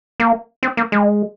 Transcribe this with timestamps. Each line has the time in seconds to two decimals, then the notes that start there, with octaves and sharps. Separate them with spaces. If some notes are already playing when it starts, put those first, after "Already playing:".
0.20 A#3
0.63 C4
0.77 A#3
0.92 G#3